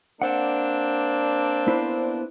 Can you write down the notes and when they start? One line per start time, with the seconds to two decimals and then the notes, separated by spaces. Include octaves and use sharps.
0.22 A#3 C4 D4 F#5
1.67 B3 E4 C5